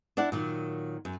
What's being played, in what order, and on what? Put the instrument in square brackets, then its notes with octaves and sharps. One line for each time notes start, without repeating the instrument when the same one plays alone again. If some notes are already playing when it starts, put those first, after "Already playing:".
[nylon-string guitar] D4 E4 D5 F#5
A#2 D#3 F#3
F#2